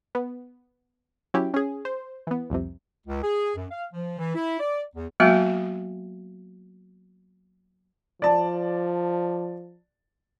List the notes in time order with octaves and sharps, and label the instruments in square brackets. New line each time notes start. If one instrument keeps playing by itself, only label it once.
[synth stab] B3
F#3 C#4 E4 G4
C#4 G#4
C5
E3 B3
C2 F2 C3
[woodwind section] C#2
G#4
F#2
F5
F3
E3
E4
D5
E2
[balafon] F#3 G#3 A#3 B3 F#4 E5
[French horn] F3 [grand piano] D5 A5